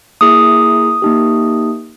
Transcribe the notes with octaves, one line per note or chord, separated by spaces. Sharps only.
A#3 E4 G#4 D#6
A#3 D#4 G4